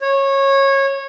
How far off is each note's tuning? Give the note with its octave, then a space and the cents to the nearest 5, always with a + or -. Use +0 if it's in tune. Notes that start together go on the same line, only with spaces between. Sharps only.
C#5 -20